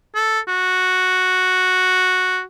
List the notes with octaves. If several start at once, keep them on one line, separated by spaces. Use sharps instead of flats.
A4
F#4